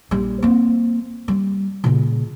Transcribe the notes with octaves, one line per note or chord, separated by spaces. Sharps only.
A#1 G3
A#3 C4
G3
A#2 C#3